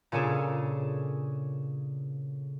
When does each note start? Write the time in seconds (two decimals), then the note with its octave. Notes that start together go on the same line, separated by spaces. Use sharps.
0.12 A#2 C#3 C#4 D4 G#4 A4